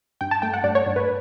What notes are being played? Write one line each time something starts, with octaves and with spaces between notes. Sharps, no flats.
G2 G5
A5
A3 G5
F#5
G2 D5
C#5
G2
B4